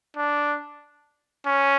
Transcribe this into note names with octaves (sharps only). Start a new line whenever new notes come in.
D4
C#4